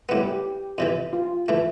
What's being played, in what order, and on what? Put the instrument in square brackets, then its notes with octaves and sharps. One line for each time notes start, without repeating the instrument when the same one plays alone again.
[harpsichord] A2 G3 B3 [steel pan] B4
[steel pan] G4
[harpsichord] F2 C3 E3
[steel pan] F4
[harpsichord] E3 A3